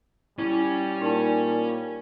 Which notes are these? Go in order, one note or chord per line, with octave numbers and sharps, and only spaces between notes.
G3 C#4 E4
A#2 D#4 A5